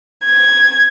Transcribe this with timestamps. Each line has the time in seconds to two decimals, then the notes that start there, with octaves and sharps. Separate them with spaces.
0.25 G#6